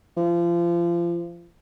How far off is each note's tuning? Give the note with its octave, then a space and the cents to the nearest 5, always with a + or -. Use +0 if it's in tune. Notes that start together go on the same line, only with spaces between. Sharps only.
F3 -30